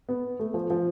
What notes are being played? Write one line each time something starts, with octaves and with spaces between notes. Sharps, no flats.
B3
A3
F3
F3